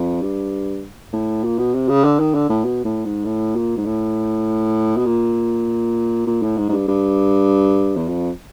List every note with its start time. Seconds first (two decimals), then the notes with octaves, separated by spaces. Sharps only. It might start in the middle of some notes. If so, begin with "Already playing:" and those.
Already playing: F2
0.22 G2
1.13 A2
1.44 A#2
1.59 B2
1.74 C3
1.89 C#3
2.04 D3
2.19 D#3
2.34 D3
2.49 A2
2.65 B2
2.85 A2
3.05 G#2
3.25 A2
3.56 A#2
3.77 G#2
3.85 A2
4.97 B2
5.06 A#2
6.27 A#2
6.42 A2
6.57 G#2
6.69 G#2
6.73 G2
6.88 G2
7.96 E2
8.08 F2